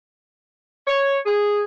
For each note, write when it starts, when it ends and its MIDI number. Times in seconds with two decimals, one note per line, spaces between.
0.87 1.18 73
1.26 1.64 68